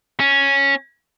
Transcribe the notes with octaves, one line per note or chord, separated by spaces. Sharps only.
C#4